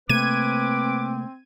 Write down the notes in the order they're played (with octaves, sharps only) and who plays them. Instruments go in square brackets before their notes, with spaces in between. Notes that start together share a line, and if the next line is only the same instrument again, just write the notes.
[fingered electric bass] C3 A3 A#3 [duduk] C4 [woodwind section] B4 D6 [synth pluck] G#6 D#7